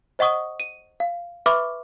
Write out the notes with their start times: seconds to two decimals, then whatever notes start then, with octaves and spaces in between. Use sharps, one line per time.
0.19 C5 D#5 F#5 C#6 D#6
0.60 D#7
1.00 F5
1.46 B4 E5 B5 C#6 D6 F6